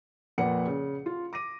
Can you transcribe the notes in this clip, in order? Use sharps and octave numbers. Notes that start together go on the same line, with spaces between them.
F2 A#2 B4 F#5 C#7
C#3
F4
D6 A#6 D#7